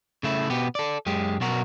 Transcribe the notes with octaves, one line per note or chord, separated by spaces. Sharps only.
C#3 A3 E4
B2 B3 G4
A4 D5
F#2 G#3 G4
B1 B2 F#4 A#4